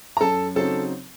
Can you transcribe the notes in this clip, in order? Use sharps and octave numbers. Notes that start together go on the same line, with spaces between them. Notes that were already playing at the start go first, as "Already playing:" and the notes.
A#5
F#2 A4 A5
C#3 F#3 C4 D#4 A4 A5